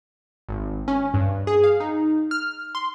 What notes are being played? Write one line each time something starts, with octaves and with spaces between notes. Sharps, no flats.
G#1
C#4
G2
G#4
F5
D#4
F6
C6